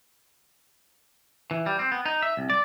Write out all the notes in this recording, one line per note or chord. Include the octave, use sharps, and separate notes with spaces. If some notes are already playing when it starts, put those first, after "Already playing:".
E3
G3
C4
B3
D#4
E5
C2
D5